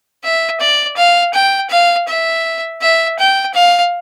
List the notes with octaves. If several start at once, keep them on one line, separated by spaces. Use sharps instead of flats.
E5
D5
F5
G5
F5
E5
E5
G5
F5